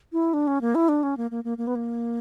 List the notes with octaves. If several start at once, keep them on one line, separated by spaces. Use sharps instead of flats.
E4
D4
C#4
A#3
E4
D4
C#4
A#3
A#3
A#3
A#3
B3
A#3